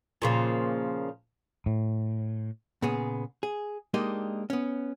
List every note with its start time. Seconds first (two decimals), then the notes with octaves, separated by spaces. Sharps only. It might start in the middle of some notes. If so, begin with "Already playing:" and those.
0.22 A#2 C#3 F3
1.66 A2
2.82 A#2 C#3 B3 G#4
3.43 G#4
3.94 G#3 A#3 D4 D#4 G4 D#5
4.50 B3 C#4